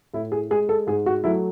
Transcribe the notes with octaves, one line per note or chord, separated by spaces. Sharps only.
A2 E4
G#4
G#3 G#4
A4
G#2 G#4
F#4
F#3 A3 E4